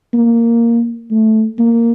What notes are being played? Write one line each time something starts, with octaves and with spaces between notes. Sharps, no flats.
A#3
A3
A#3